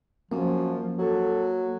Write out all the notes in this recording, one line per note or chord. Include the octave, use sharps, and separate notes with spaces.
F#2 F3 A#3
F#3 A4